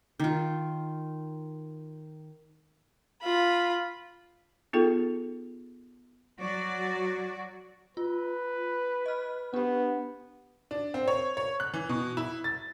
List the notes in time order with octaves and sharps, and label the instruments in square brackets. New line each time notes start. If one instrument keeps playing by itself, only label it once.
[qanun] D#3 F4
[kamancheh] F4 B5
[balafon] B3 D#4 F4 G#4 A4 G5
[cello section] F#3 F#4 D5
[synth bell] F4 [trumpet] B4
[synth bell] D#5 F6
[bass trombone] B3 [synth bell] D4 G4
[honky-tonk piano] D4
C4
C#5
C#5
F#6
E3
B2
E4
A6